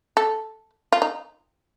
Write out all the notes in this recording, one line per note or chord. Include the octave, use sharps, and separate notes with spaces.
A4
F4
D#4